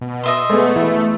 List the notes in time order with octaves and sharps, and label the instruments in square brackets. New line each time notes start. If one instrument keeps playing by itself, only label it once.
[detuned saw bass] B2
[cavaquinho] D#5 E5 C6
[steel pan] G#3 B3 [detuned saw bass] A3
[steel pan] E3 E4